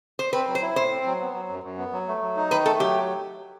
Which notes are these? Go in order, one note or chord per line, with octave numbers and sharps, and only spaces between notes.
C5
C4 B4
F#3
C5
E4
A2 C5
C4
F#3
B3
F#3
F#2
F#2
B3
F#3
A3
F#3
D#4
D#3 B4
A3 A4
F#3 G4